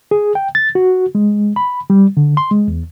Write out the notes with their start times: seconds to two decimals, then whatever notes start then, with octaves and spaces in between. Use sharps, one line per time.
0.11 G#4
0.35 G5
0.55 A6
0.75 F#4
1.15 G#3
1.56 B5
1.90 G3
2.17 D3
2.37 C6
2.51 G#3
2.68 E2